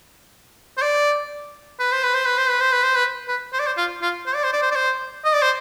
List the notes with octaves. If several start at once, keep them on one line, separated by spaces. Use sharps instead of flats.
C5
D5
B4
C5
B4
C5
B4
C5
B4
C5
B4
C5
B4
B4
C5
D5
C5
F4
F4
C5
D5
C5
D5
C5
D5
C5
D#5
D5
C5